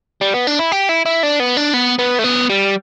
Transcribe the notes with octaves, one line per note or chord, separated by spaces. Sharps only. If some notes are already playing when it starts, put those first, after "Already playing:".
G3
B3
D4
E4
G4
E4
E4
D4
B3
D4
B3
B3
A3
B3
G3